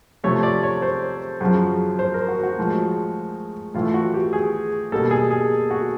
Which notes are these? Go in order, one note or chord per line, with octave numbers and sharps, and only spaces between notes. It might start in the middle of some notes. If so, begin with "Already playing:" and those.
C3 F3 A3 C#5
D5
C#5
C5
F#2 C#3 F3
C5
A#4
F#4
F#4
A2 F3 G#3
A2 E3 A3 F4
F#4
G4
G#4
B2 G3 A#3 A4
G#4
G#4
F#4